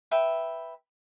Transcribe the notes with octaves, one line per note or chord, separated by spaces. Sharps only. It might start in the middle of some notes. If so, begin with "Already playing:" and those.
B4 E5 G5